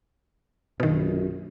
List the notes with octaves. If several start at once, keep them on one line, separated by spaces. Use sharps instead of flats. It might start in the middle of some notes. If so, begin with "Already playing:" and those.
A#1 F#2 B2 D#3